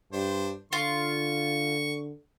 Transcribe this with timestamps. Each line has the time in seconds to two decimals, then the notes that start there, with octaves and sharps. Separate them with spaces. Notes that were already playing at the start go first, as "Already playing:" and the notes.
0.13 G2 D4 C5
0.73 D3 F4 C#6